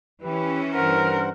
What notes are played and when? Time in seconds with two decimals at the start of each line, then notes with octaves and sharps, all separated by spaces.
0.22 E3 C#4 G4 B4
0.74 G2 A#4 C5 F#5